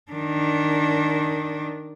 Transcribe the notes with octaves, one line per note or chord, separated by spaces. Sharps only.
D#3 D4